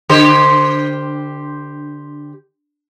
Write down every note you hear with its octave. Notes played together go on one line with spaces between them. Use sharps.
D3 G4 C5